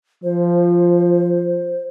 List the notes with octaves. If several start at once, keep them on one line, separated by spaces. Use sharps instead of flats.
F3 C5